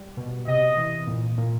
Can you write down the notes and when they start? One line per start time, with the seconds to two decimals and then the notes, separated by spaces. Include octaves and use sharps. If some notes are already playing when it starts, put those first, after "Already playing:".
Already playing: G3
0.17 B2
0.47 C3 D#5
0.77 E3
1.07 A#2
1.38 A#2